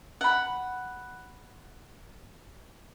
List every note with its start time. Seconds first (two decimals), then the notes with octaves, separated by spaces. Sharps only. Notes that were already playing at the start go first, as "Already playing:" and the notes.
0.21 F#5 B5